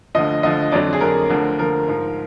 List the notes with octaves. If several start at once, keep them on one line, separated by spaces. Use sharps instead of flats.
D2 D3 F3 D#5
D2 D3 F3 D#5
F2 D3 F#3 D5
G#4
F2 D3 F#3 A#4
D2 D3 F3
D2 D3 F3 A#4
G#2 F3